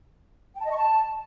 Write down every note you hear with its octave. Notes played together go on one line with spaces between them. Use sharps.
G5
A5
D#5
C#6
A5